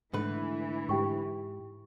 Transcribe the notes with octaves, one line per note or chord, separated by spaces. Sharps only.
G#2 D3 E3 A3 B4
G#2 G4 G5 C#6